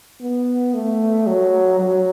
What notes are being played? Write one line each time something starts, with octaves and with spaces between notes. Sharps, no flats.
B3
A3
F#3
F#3